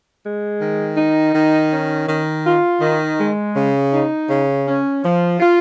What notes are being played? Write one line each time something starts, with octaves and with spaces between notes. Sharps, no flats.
G#3
D#3
D#4
D#3
C#4
D#3
F4
D#3
G#3
C#3
D#4
C#3
C#4
F3
F4